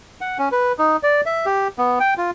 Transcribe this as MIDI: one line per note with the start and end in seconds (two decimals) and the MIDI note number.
0.21 0.38 78
0.38 0.49 61
0.52 0.72 71
0.78 0.97 63
1.03 1.21 74
1.26 1.46 76
1.46 1.68 67
1.78 1.99 59
2.00 2.14 79
2.17 2.31 65